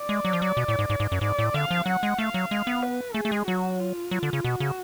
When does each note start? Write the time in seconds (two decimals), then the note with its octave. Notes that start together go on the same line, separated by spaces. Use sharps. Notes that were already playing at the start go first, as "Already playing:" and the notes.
Already playing: D5
0.09 G#3
0.25 F#3
0.33 F3
0.42 F#3
0.57 B2
0.68 A2
0.79 G#2
0.90 G#2
1.00 G#2
1.12 F#2
1.21 G#2 D5
1.39 A2
1.54 D3 F5
1.71 F3
1.86 F#3 F#5
2.03 G#3
2.18 A3 F5
2.34 F#3
2.51 G#3
2.67 B3
2.83 B4
3.14 A3 G#4
3.25 A3
3.32 G#3
3.47 F#3 F#4
3.80 F4
4.11 F#3
4.23 D3
4.33 C#3
4.44 B2 F#4
4.60 C#3